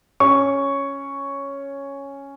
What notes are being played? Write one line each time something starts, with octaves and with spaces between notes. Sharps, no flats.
C#4 C#6